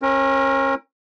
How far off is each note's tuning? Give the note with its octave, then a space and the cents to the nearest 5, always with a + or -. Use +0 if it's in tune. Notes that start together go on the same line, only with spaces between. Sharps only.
C#4 -35 A#4 +10